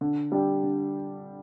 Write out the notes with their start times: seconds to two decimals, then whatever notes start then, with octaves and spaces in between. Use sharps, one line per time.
0.01 D3
0.32 G3 D4 G4
0.63 D3